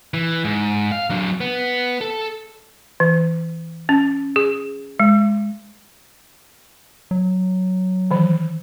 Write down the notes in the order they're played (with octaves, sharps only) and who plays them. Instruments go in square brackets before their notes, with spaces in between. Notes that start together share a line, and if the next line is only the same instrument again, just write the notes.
[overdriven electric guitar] E3
G#2
F5
F#3 D4
B3
A4
[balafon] E3
C#4
G#4
G#3
[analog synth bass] F#3
[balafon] D#3 E3